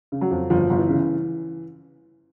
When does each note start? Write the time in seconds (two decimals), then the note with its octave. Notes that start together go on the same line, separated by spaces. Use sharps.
0.12 C#3
0.21 F#3
0.31 F2
0.50 G1 F3
0.70 G1
0.79 E3
0.89 C#3